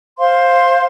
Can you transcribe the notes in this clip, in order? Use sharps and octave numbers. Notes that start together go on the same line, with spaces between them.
C5 F5 C6